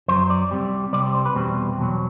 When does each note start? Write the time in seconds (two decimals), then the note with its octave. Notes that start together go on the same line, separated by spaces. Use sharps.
0.08 F#2 F#3 C5
0.30 D5
0.51 C2 C3 G3
0.93 C2 C3 G3 D5
1.03 D5
1.14 C5
1.26 B4
1.35 E2 B2 G3 C4
1.78 E2 B2 F#3